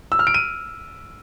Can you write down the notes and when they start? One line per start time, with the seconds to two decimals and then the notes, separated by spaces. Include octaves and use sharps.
0.12 E6
0.19 F6
0.27 D7
0.34 D#7